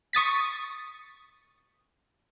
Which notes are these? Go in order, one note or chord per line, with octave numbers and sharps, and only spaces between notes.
C#6 D#6 A6 B6